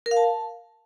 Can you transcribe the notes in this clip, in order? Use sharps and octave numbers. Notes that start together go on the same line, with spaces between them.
A#4
F5
A5